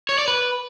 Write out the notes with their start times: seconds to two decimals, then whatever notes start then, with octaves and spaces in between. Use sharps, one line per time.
0.09 C#5
0.18 D5
0.28 B4